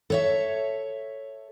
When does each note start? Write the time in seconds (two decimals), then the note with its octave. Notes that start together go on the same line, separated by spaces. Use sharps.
0.10 A4 C#5 E5